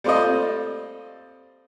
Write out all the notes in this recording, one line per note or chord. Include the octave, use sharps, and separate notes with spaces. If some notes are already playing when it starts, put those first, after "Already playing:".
G3 A3 C4 F4 A4 D#5